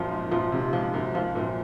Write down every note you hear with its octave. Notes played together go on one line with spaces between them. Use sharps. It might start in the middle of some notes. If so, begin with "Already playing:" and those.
Already playing: F#2 A#2 C#3 F3
G#2
F#2 A#2 F3
G#2 C3
G#2 F3
F#2
G#2 F3
F#2 A#2